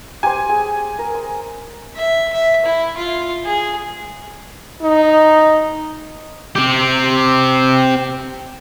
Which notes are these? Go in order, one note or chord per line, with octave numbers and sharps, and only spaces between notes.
G4 C5 G#5
G#4
A#4
C6
E5
E5
E4
F4
G#4
D#4
C4 G4